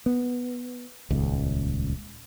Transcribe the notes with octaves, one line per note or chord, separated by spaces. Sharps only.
B3
D#1 C#2